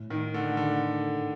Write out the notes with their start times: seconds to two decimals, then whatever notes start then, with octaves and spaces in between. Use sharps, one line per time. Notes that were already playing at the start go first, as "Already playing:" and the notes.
Already playing: A2
0.10 D#3
0.34 D3
0.57 D3